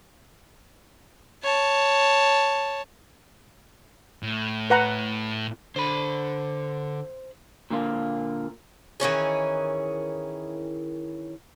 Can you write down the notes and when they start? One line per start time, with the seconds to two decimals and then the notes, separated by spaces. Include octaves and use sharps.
1.43 C#5 A5
4.23 A2
4.70 B4 F#5 A#5
5.76 D3 C5 B5
7.70 A#2 D3 A#3 F4
9.00 D#3 E3 C#4 G#4